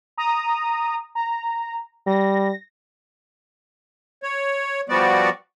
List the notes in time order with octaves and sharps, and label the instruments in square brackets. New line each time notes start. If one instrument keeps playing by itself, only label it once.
[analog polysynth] A#5 D#6
A#5
[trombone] G3 [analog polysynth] A#6
[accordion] C#5
F3 G3 B3 F#4 D5